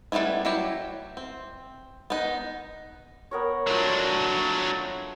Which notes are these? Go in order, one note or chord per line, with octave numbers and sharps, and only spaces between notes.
G3 A3 B3 C#4 E4
F#3 E4 G4
C4
B3 D#4
B3 A#4 C#5
F#3 A3 D4 F4